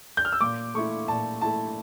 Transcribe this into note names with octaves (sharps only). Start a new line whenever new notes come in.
G6
F6
E6
A#2 D6
A3 E4 C#6
A#2 A5
A3 E4 A5